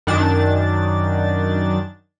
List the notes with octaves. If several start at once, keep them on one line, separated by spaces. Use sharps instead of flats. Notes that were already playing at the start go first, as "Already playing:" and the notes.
F#2 D#3 D4 A6